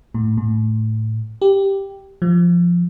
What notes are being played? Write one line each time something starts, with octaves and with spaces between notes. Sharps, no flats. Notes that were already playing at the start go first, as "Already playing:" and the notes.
A2
A2
G4
F3